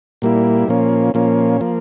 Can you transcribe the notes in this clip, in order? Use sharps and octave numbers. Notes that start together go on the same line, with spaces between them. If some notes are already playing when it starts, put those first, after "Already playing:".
A#2 G3 A#3 E4
A#2 F3 A#3 C#4
A#2 F3 A#3 C#4
F3 A#3